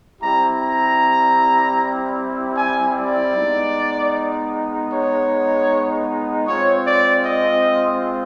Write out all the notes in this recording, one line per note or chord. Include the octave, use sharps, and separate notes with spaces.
G3 C4 E4 G4 A#5
A#5
G#5
D5
G#3 B3 D#4
C#5
G#3 C4 F4 C#5
D5
D#5